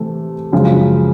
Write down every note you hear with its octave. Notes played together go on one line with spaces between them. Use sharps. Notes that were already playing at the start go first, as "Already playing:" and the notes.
Already playing: C3 E3 A3
F#2 C#3 F3 G#3